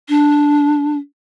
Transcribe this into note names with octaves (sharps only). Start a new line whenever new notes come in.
D4